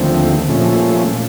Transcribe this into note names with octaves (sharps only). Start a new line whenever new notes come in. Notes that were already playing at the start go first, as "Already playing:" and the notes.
Already playing: D#2 D3 F3 A3 C4
A#2 F3 A3 C#4